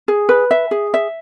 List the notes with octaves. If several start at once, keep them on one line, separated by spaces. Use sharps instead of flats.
G#4
B4
E5
G#4
E5